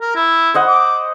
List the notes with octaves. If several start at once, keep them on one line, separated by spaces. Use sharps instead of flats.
A#4
E4
C5 D#5 F#5
D6